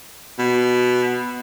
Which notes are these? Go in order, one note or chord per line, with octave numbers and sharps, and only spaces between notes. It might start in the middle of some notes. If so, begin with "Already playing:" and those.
B2